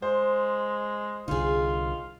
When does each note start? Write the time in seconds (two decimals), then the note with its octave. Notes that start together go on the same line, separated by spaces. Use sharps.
0.02 G#3 C5
1.28 C2 D3 D#4 F4 G#4